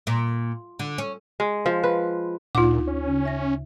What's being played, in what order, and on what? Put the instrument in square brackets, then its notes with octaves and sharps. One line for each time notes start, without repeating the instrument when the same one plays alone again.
[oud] A#2
D3
C#4
[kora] G#3
F3
B4
[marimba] D2 D#4 [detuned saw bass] A#2 [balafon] F4 D6
[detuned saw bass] C#4
[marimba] C#3
E5 A#6